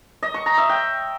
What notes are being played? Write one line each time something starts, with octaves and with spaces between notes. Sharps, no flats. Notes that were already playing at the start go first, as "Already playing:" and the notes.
D#5
C#6
A#5
E5
G5